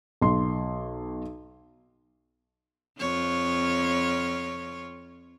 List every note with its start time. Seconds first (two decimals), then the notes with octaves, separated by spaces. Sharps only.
0.21 B1 C6
3.00 F2 F4 C#5